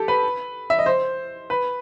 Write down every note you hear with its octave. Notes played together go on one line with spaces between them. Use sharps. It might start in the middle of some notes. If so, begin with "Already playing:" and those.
Already playing: G4 A4
B4
E5
D#5
C5
B4